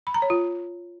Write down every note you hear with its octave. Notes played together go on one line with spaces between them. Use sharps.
B5
A#5
C#5
F4